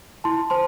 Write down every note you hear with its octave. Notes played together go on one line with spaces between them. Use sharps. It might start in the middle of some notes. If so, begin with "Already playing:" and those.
E4 A5 C6
C5 A5 C6